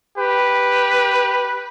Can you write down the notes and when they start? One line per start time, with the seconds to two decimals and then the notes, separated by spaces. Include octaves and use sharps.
0.18 G4 B4